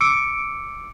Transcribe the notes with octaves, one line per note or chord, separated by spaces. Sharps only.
D6 E6 C#7 D7